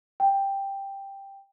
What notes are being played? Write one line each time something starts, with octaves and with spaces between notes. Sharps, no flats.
G5